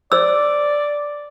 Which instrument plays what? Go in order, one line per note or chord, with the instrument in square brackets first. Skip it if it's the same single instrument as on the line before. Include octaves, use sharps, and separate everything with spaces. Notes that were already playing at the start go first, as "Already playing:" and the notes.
[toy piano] C5 E6 [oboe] D5